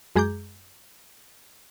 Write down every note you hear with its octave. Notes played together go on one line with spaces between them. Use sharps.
F#2 G#3 G#4 A#5 D6 G6